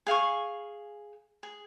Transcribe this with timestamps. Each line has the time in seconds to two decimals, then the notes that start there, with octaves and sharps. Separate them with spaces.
0.07 G#4 F5 G#5 C#6
1.43 G#4